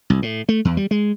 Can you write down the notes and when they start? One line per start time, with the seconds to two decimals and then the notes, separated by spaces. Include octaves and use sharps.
0.10 C2
0.22 A2
0.49 A3
0.65 E2
0.77 G3
0.91 G#3